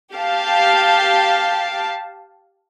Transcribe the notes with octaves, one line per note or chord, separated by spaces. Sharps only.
G4 F5 A5